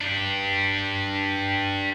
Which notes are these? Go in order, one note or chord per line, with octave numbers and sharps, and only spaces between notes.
D4 G4